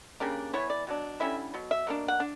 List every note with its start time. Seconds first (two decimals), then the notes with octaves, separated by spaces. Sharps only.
0.20 C#3 G3 A#3 D4
0.53 E3 B3 E4 C#5
0.70 D5
0.87 B2 F#3 D4
1.20 D3 G3 C#4 E4 E5
1.54 B2 F#3
1.71 E5
1.87 B2 A#3 D4
2.08 F#5
2.20 D4